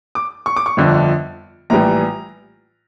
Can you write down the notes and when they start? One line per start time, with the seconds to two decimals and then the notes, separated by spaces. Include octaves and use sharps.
0.15 D6
0.46 C#6
0.56 D6
0.66 C#6
0.77 G1 F2 D3 F3
1.70 A#1 A2 E3 G3 A#5